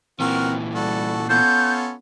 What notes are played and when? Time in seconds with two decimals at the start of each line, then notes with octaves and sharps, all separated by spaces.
0.20 A#2 E3 C4 F#4 A#4 F6
0.75 G3 F#4 A4
1.29 B3 C#4 F4 A4 G6